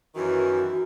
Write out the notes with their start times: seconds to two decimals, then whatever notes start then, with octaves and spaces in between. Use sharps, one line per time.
0.15 F#2 D#3 E3 F#4